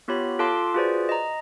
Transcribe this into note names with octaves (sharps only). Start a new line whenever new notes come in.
B3 F4 G4 C#5 B5
F4 A4 F5 A5 C6 D6
F4 F#4 G#4 B4 C5 D5
D#5 A#5